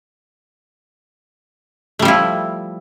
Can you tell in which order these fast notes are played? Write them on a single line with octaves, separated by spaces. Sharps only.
A3 G3 F3 E4